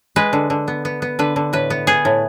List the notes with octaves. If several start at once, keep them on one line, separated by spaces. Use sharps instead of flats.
G#3 B4
D3
D3
B3
B3
B3
D3 B4
D3
A2 B4
B3
B3 G#4
A2